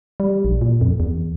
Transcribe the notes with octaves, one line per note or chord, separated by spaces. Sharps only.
G3
A#1
A#2
F2
E2